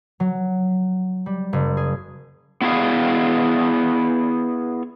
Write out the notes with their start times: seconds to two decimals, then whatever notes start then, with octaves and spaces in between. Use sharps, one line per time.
0.20 F#3
1.26 G3
1.53 F#1
1.77 G#4
2.61 B3 E4 G#4 F5